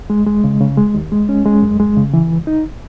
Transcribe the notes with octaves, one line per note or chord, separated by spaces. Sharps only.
G#3
G#3
C#3
C#3
G#3
D#2
G#3
C#4
G#3
F#2
G#3
C#3
E3
C#2
D#4